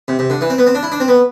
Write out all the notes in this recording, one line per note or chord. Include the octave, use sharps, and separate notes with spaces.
C3
C3
D3
E3
C4
B3
C4
D4
E4
D4
C4
B3